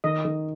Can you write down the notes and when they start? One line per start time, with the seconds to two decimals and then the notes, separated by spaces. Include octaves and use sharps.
0.04 D#3 D#5
0.25 D#3